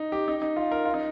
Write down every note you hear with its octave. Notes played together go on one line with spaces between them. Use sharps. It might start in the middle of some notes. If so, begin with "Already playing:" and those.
Already playing: D#4
G4
D#4
D#4
F4
A#4
F4
D#4